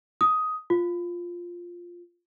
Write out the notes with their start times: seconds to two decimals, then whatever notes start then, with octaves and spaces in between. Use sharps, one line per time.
0.21 D#6
0.70 F4